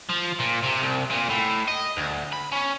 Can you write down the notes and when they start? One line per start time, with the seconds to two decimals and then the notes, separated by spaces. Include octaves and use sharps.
0.09 F3
0.40 A#2
0.64 C3
0.82 C2
1.11 A#2
1.30 A2
1.68 D#5
1.97 D2
2.32 B5
2.52 C#4